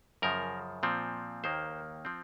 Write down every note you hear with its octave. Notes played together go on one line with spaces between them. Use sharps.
F#2 C#3 F3 A#4
A#2 F3 C4
D#2 D#3 A#3 C5
F3 C4